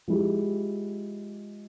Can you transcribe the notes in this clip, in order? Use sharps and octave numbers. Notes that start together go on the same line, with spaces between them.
F3 G#3 E4 G4